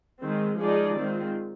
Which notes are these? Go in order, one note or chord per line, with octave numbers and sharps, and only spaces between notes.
D#3 G#3 C4
F3 G#3 D#4 G#4 D5
D#3 G#3 C4 F4